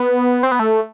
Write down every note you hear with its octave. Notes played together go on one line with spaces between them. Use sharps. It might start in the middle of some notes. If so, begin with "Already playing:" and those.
Already playing: B3
C4
B3
A3